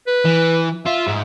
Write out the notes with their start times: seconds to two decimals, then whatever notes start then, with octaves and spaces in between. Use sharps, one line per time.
0.07 B4
0.25 E3
0.86 F4 E5
1.07 G#2